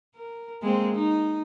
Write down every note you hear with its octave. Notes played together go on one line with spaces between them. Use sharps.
A#4
G#3 A#3 C4
D#4